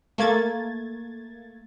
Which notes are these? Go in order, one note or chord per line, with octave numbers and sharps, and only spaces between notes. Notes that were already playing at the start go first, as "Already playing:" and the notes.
A3 A#3 G#6 A6